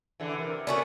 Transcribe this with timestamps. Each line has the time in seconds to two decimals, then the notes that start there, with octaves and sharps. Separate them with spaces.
0.20 D3 E3
0.39 C3 A#4
0.67 A3 B3 C#4 F#4 D5